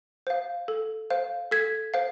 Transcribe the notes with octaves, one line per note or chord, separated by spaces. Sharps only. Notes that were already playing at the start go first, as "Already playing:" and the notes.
C5 F5
A4
C5 F5
A4 G#6 B6
C5 F5